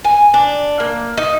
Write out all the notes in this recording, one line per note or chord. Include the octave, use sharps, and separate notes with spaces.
G#5
D4
A#3
D#4